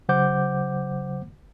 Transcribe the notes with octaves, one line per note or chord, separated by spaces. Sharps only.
C#3 F#3 C5 F#5 D6 G6